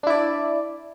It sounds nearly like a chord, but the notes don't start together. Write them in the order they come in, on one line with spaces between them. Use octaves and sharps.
D4 E4 D5